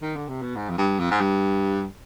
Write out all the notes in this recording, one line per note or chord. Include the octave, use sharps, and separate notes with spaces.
D#3
D3
C3
B2
G#2
F2
G2
F2
G#2
G2